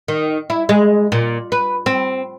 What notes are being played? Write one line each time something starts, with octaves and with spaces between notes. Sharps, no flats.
D#3
E4
G#3
A#2
B4
C4